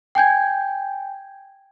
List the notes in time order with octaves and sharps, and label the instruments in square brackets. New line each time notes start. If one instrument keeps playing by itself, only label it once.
[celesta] G5 G#5 G6 G#6